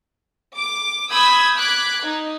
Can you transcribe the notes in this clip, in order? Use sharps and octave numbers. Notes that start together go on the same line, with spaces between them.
D6
B5 D#6 E6 G6 G#6
D6 F#6 G#6 B6
D#4